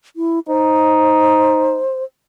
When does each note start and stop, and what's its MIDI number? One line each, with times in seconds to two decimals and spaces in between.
0.16 0.39 64
0.48 1.83 63
0.48 2.03 72